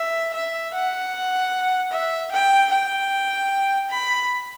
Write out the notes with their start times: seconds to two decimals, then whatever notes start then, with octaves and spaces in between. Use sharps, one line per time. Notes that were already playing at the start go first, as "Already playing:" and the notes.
Already playing: E5
0.34 E5
0.73 F#5
1.91 E5
2.31 G5
2.71 G5
3.90 B5